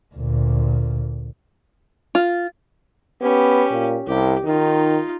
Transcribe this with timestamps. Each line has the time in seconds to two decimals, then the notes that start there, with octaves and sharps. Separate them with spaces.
0.15 D2 A#2
2.15 F4
3.21 B3 C#4 G4
3.72 A#2
4.07 C2 G4
4.45 D#3 D#4 F4